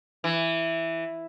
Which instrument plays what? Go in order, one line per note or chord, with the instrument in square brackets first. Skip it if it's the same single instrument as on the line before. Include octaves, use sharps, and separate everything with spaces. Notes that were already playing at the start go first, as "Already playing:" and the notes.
[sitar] E3